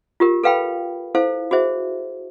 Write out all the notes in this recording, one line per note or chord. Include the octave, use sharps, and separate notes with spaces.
F4 G4 A#4
A4 B4 F5 G5 B5
E4 A4 C5 F5
F#4 G#4 C5 E5